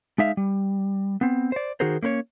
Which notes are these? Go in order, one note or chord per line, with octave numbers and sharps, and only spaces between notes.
G#3 D#4 E5 F5
G3
B3 C4
C5 D5
D#3 D#4 F#4 G#4 A#4 C5
A#3 C#4 B4 C#5